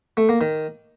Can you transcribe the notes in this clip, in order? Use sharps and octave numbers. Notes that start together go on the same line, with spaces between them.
A3
A#3
D#3